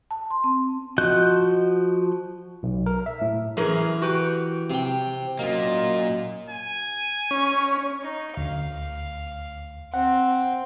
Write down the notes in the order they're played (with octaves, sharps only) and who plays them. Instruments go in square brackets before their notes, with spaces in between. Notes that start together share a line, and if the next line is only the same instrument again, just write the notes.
[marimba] A5
C6
C4
[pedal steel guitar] F3 F#4 D#5 F#6 G6
[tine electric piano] B1
A#4
E5
A2
[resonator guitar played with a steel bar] F#2 G#4 A#4 [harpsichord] E3
[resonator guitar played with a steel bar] F#4 G4 B4
[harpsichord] C3 G5
[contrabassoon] F#2 [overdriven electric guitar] A#2 A#3 [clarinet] D#5
[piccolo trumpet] G#5
[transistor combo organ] C#4
[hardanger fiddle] D#4
[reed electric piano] D2 [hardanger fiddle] F5
[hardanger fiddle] C4 [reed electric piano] F#5